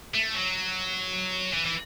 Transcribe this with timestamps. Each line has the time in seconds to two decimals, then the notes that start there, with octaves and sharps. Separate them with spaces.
0.14 A3
0.34 F#3
1.54 E3
1.66 E3